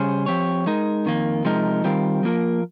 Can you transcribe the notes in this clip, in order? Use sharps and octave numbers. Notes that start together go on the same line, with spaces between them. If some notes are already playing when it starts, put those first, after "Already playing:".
Already playing: C#3 G3 C#4 G#4 C5
F3 C4 G4 C#5
G#3 D#4 A#4
F2 D#3 A#3
C3 F3 G#3 D#4 A#4
D#3 G3 C4 F4 A#4
F3 A#3 F4 A#4